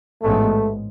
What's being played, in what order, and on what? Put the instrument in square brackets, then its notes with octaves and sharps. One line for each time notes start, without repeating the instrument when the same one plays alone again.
[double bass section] A1 G#2 G#3 B3 [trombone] A3